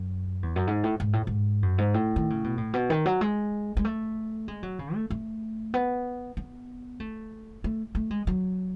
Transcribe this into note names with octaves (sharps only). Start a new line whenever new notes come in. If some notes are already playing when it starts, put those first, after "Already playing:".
Already playing: F#2
E2
F#2
G#2
A2
G#2
A2
G#2
F#2
G#2
A2
D#3
C#3
B2
A2
B2
D#3
F#3
G#3
G#3
A3
G#3
F#3
C#3
A3
A3
B3
B3
A3
A3
A3
G#3
F#3